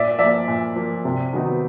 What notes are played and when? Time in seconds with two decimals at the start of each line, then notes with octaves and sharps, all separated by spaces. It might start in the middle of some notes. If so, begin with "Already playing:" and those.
Already playing: A#2 D5 E5
0.19 F3 A#3 D5 E5
0.48 A#2
0.76 F3 A#3
1.05 C3
1.33 D#3 F#3 B3 D#4